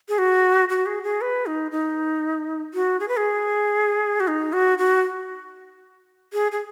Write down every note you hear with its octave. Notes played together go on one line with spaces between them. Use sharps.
G#4
F#4
F#4
G#4
G#4
B4
D#4
D#4
F#4
G#4
B4
G#4
F#4
D#4
F#4
F#4
G#4
G#4